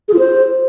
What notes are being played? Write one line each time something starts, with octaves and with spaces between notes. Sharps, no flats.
G#4
F4
C5